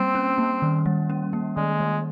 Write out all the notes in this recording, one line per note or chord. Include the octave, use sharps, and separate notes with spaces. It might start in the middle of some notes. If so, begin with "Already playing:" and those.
Already playing: G3 A#3 C4 C#4
C#4
A#3
D#3
G3
C#4
A#3
D#3 G#3
G3